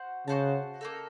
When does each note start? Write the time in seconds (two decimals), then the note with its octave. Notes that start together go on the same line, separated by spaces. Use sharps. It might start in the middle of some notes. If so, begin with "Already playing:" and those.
Already playing: F#4 C5 F#5
0.27 C#3 F#4 C5 F#5 A5
0.81 A#3 D#4 A4